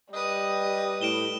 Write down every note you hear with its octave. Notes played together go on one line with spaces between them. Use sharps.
G3 B4 D#5 D#6
A2 D7 E7 G7